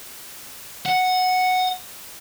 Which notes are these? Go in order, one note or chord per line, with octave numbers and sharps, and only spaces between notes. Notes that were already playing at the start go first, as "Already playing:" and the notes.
F#5